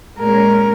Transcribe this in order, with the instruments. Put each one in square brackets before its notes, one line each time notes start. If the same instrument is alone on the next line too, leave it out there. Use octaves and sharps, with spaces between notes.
[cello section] A#2 G#3 C#4 [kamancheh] A#4